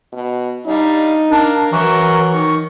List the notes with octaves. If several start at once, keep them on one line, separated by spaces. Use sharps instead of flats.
B2
G3 D4 D#4 F5
D4 A#4 F5
E3 F#3 A#4 E5 C#6
D#3 C#6